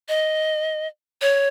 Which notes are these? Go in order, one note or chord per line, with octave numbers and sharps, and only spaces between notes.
D#5
C#5